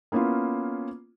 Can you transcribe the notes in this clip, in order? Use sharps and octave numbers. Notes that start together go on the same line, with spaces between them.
A#3 B3 C#4 E4 F4